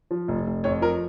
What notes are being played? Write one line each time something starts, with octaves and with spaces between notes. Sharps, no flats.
F3
F1
F1
F2 C#5
F3 A#4